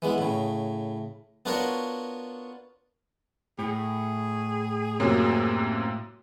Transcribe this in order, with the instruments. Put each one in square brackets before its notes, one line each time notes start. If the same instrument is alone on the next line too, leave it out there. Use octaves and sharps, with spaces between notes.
[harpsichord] E3 G#3 B3
A2 C#3
B3 D4 F4 F#4 A#4 C#5
[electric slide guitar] A2 [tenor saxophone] G#4
[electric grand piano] F#2 C3 A#3 [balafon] F#4 G4 C#5